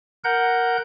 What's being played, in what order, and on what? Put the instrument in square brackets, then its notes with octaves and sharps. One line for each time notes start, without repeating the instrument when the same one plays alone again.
[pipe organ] A#4 F#5 G6